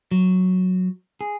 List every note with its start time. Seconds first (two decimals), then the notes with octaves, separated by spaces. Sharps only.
0.12 F#3
1.21 G#4